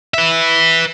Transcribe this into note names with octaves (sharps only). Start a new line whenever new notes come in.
B4 E5